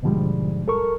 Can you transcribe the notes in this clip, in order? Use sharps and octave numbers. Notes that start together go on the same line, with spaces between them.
G#2 B2 D3 F3 G3 G#3
A4 A#4 C#6